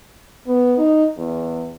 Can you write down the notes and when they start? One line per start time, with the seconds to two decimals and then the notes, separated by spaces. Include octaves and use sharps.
0.47 B3
0.78 D#4
1.17 E2